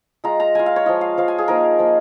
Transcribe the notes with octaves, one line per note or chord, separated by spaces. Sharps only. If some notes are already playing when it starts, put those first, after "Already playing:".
G#3 F4 A#5
A#5
G#3 F4 G#5
F5
C#5
F3 G#3 F4 D#5
F5
F3 G#3 F4 F5
G#5
G#4
F3 A#3 D#4 A#4
F3 A#3 D#4